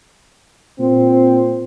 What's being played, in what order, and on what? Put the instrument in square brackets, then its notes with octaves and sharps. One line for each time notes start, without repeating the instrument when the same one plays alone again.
[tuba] A#2 [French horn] C4